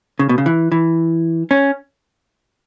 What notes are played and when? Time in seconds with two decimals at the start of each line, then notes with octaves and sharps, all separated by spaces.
0.19 C#3
0.29 B2
0.38 C#3
0.46 E3
0.72 E3
1.51 C#4